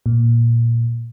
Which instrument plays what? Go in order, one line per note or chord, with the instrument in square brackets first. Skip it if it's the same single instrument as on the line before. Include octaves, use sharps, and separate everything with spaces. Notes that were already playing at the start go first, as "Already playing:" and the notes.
[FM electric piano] A#2